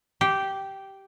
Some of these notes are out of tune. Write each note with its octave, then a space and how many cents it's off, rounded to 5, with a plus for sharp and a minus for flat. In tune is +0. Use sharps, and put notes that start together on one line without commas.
G4 -10